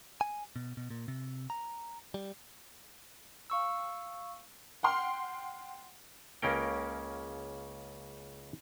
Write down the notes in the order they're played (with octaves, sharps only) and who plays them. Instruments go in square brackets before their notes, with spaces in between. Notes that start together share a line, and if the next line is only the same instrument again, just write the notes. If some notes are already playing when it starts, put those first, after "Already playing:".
[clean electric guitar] G#5
B2
B2
A#2
C3
A#5
G3
[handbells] F5 C#6 E6
[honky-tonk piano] F#5 G5 C6 F6
[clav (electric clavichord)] C#2 C#3 A#3 C#4 A#4 G5